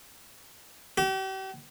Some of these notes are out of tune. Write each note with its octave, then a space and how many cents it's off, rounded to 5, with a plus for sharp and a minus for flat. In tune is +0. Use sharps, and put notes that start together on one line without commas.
G4 -40